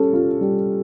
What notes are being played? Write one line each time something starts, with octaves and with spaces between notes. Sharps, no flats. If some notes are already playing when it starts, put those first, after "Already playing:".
Already playing: G3 C#4 A4
F4
G3